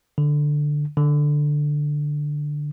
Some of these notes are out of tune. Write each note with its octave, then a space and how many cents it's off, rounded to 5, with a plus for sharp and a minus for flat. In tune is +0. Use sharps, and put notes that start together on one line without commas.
D3 +5
D3 +5